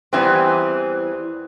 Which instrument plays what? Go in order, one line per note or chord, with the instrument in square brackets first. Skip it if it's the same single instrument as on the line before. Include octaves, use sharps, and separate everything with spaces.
[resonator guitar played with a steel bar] E2 E3 G3 C4